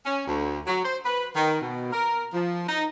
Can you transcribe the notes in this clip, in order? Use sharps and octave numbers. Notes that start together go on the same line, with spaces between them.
C#4
D2
F#3
C5
B4
D#3
B2
A#4
F3
D#4